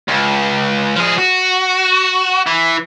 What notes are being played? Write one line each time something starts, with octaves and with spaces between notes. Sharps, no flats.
C#2
F3 G#4
F#4
E3